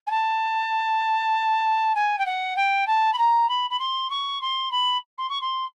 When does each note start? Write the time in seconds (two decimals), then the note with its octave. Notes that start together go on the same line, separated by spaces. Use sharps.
0.06 G#5
0.10 A5
1.95 G#5
2.18 G5
2.25 F#5
2.56 G5
2.87 A5
3.13 B5
3.18 A#5
3.48 B5
3.70 B5
3.79 C6
4.10 C#6
4.41 C6
4.71 B5
5.18 C6
5.29 C#6
5.41 C6